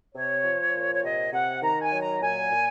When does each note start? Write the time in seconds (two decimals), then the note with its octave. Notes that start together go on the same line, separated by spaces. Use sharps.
0.14 C3 C#5
0.44 F3
0.74 A#2
0.94 C#5
1.03 C3 D#5
1.32 C3 F#5
1.62 D#3 A#5
1.82 G#5
1.92 F#3
2.01 A#5
2.21 A#2 G#5
2.51 A#2